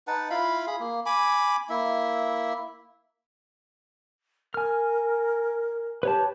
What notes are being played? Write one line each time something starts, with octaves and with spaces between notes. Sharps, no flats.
D#4 B4 F#5 A5
E4 F4 F5 B5
G#4 B5
A#3
G#5 B5 D6
A#3 E4 E5
A#4 G#5 F6
G4 B4 C#5 A5